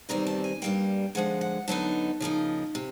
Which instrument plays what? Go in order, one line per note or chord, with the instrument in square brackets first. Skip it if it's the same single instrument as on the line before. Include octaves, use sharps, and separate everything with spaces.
[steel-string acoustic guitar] E2 C3 D#3 G3 C4 A#5
A5
G#5
G2 E3 G3 A#3 G5
D3 F3 G#3 F#5
F#5
D3 F#3 B3 D#4 A5
C#3 F3 A#3 D#4
C3